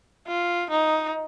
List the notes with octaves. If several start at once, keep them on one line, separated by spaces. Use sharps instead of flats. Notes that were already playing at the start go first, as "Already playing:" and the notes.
F4
D#4